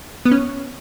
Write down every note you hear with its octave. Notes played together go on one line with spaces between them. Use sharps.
B3
C#4